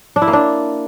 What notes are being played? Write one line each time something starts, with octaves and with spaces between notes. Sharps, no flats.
D4
E4
A#3
D4